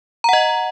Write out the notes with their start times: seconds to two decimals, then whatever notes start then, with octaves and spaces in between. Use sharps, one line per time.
0.24 A#5
0.29 F#5
0.33 D#5